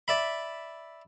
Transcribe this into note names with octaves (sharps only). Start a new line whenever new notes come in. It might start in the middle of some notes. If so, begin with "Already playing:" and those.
D5 E5 B5